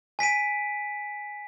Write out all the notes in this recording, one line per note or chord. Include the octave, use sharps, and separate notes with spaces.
G#5 B6 D7 D#7